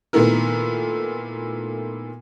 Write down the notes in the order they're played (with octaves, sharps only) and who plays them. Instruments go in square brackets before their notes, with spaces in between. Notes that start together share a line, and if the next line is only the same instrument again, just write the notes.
[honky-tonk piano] A#2 D#3 A3 B3 E4 A#4